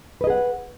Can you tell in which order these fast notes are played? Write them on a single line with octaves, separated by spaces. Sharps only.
B4 D#5 G#4 F#5